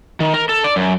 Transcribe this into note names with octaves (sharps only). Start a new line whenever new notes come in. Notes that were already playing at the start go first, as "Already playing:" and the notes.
D#3
A#4
A4
D5
F#2